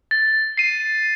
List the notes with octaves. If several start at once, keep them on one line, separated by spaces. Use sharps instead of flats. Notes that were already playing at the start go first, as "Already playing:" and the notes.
A6
C7 D#7